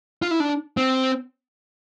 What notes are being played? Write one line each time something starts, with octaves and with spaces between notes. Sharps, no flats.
F4
E4
D4
C4